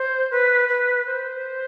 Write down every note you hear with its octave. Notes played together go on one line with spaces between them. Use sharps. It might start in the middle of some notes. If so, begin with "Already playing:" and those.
Already playing: C5
B4
B4
C5